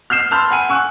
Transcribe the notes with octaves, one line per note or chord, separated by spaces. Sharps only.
F6 G6 C7 E7
A5 B5 C6 E6 F6 G6
F#5 G#5 D#7
G#5 C#6 E6 F#6